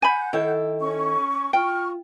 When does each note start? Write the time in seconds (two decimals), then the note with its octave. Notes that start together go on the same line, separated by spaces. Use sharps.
0.02 F#5 G#5 B5 G6
0.33 D#3 E4 A4 G5
0.79 C#4 C#6
1.53 F4 G5 C#6 F6